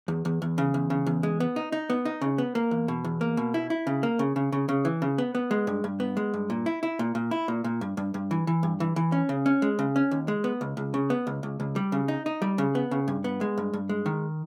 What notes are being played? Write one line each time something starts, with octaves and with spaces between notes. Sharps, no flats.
E2
E2
E2
C#3
E2
C#3
E2
G#3
B3
D#4
D#4
B3
D#4
C#3
B3
A#3
E2
B2
E2
A#3
B2
E4
E4
C#3
A#3
C#3
C#3
C#3
C#3
E3
C#3
B3
B3
G#3
G2
G2
B3
G#3
G2
A#2
E4
E4
A#2
A#2
E4
A#2
A#2
G2
G2
G2
E3
E3
G2
E3
E3
C#4
C#3
C#4
G#3
C#3
C#4
D#2
G#3
B3
C#2
C#2
C#3
B3
C#2
C#2
C#2
G3
C#3
D#4
D#4
G3
C#3
B3
C#3
G2
B3
G#3
G2
G2
G#3
D#3